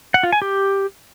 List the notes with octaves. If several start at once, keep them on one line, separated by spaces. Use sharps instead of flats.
F#5
F4
G#5
G4